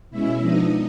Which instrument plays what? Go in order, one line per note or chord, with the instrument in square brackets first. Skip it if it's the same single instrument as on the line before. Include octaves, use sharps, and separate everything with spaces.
[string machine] B2 G#3 C#4 E4 E5
F3 G#3 B3 D4 D#4 D#5